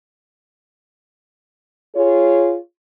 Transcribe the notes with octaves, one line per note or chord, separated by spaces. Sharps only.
F4 G#4 C#5